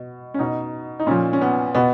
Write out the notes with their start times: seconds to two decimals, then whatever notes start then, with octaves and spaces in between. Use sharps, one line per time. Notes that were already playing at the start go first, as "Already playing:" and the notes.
Already playing: B2
0.34 C#4
0.39 B2 D#4
1.00 D#4
1.06 A#2 F3 C#4
1.33 C#4
1.41 B3
1.75 B2 B3